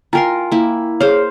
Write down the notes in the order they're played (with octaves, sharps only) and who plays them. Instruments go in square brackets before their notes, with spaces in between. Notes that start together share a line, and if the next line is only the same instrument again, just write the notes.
[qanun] F4 A#4 C6 [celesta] G5 G#5 A#5
[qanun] A#3 E4
[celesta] G#4 C#5 [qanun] C5 F5